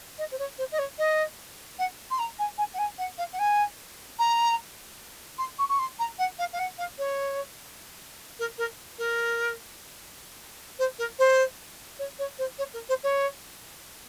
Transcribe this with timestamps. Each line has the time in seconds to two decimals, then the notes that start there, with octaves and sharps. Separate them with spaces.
0.18 D#5
0.31 C5
0.39 C#5
0.58 C5
0.72 D#5
0.79 C#5
0.98 D#5
1.79 F#5
2.11 C6
2.19 A#5
2.39 G#5
2.58 G#5
2.74 F#5
2.78 G#5
2.98 F#5
3.18 F5
3.33 F#5
3.39 G#5
4.19 A#5
5.38 C6
5.59 C#6
5.69 C#6
5.79 C6
5.99 A#5
6.19 F#5
6.39 F5
6.53 F5
6.59 F#5
6.78 F5
6.98 C#5
8.39 A#4
8.58 A#4
8.98 A#4
10.79 C5
10.99 A#4
11.19 C5
11.99 C#5
12.19 C#5
12.39 C5
12.59 C#5
12.74 A#4
12.89 C5
13.03 C#5